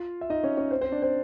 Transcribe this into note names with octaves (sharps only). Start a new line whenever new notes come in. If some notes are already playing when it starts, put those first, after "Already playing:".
Already playing: F4 F5
E5
D#4 D#5
C#4 C#5
C#4 C#5
C4 C5
C4 C5
D4 D5
C4 C5